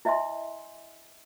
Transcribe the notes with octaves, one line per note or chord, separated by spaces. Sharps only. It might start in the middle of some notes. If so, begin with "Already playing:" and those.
E4 D#5 E5 G#5 C6